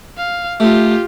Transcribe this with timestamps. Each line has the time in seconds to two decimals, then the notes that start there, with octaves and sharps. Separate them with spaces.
0.17 F5
0.60 A3 F4 G4